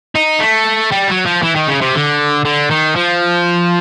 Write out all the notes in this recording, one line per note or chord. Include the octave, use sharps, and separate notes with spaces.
D#4
A3
G3
F#3
F3
E3
D#3
C#3
C3
D3
D3
D#3
F3